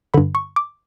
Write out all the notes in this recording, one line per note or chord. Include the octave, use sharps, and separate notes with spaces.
G2 D3 B5
C#6
D6